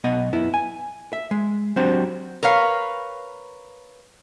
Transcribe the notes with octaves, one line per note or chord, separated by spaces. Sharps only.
B1 B3 D#5 F#5
F#2 B3 E4
G#5
E5
G#3
F#3 C4 D4 F#4 G4 C5
A#4 B4 C#5 F5